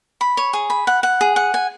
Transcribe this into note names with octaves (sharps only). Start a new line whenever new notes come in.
B5
C#5
G#4
B5
F#5
F#5
G#4
F#5
G#5